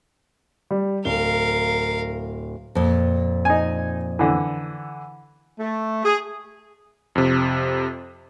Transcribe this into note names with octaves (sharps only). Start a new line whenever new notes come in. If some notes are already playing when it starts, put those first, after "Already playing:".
G3
D1 A#4 F5 G7
F2 A#2
D#4 G#5
D3 E3
A3
G#4
F2 C3